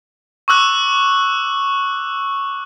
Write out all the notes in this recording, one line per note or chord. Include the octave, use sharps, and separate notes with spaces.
C#6 D6 E6 F#6